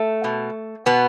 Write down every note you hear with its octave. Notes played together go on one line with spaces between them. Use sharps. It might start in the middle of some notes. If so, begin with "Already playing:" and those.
Already playing: A3
B2
B2 B3